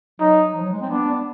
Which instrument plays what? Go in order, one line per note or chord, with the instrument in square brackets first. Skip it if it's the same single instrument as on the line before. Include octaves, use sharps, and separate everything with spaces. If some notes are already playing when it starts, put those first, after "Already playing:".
[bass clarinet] F#3 [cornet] D#4
[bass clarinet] F3
F#3
G#3
C4
[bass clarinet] B3 [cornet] D4